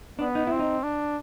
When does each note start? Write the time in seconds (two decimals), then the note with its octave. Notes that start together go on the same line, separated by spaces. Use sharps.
0.19 B3 D4
0.35 D#4
0.47 C4 E4
0.59 D#4
0.84 D4